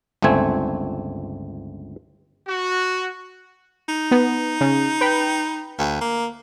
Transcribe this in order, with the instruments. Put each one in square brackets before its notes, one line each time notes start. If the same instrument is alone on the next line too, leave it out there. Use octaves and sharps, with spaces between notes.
[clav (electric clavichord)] G1 C#2 A3 C4 G#5
[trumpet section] F#4
[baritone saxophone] D#4
[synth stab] B3
C#3
B4 G5 B5
[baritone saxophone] D2
A#3